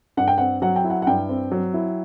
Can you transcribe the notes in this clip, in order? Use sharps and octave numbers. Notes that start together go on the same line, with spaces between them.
G2 F#5
G5
C4 F#5
F#3 F#5
G5
E4
F#5
F#5
G2 G5
C4
F#3
E4